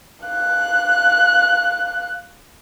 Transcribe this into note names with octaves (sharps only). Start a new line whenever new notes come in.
F5 F#6